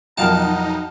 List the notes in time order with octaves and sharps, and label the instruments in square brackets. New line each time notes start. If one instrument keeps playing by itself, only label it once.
[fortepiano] B1 F2 D#3 [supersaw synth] D#4 [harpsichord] F5 A5 [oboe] A#5